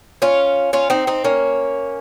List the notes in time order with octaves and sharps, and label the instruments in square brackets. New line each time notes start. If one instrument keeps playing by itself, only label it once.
[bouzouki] C#4 F4
C#4 F4
C4 D#4
C4 D#4
A#3 C#4